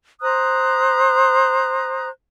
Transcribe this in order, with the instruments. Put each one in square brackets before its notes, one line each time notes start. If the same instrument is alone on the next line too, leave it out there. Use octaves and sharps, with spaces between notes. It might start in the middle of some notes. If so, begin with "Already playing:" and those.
[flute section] C5 A#5 D#6 F#6